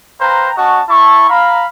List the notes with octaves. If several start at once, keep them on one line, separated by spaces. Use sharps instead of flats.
B4 C5 F5 G5 A#5
C#4 F#4 D#5 F#5 A5 C#6
E4 A5 C#6
F5 A#5 B5